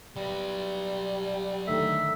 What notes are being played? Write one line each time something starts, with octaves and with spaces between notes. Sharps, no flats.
F#3 G3 B4
D3 D#3 A3 E5